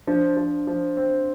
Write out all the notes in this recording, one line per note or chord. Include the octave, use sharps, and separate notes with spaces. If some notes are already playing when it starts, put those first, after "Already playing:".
F3 D4
F3
F3
C4